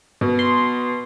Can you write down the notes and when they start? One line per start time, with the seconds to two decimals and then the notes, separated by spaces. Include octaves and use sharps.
0.21 B2
0.39 C6